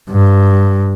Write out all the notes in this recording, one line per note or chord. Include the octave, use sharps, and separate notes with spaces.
G2